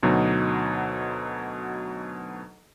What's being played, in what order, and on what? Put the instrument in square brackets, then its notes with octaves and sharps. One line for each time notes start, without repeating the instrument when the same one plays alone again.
[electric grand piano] D2 B2 F#3 D#4